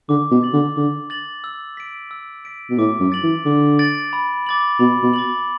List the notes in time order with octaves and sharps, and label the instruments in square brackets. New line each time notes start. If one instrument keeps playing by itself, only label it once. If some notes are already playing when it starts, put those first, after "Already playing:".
[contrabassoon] D3 [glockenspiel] D6
[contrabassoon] B2
[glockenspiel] A6 F#7
[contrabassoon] D3
[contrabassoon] D3 [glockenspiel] D6
[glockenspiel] A6 F#7
E6
B6 D7
E6
B6 D7
[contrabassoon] B2
[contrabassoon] A2 [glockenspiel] D6
[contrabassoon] F#2
[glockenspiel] A6 D7 F#7
[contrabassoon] E3
[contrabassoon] D3 [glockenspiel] D6
[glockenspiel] A6 D7 F#7
B5
D6 A6 F#7
[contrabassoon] B2 [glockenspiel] B5
[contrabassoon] B2
[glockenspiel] D6 A6 F#7